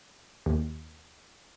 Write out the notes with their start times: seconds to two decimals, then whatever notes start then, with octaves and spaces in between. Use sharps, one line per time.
0.46 D#2